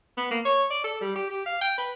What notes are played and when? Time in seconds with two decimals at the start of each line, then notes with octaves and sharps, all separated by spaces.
0.17 B3
0.31 A#3
0.45 C#5
0.70 D5
0.84 A4
1.01 G3
1.15 G4
1.30 G4
1.46 F5
1.61 G5
1.78 B4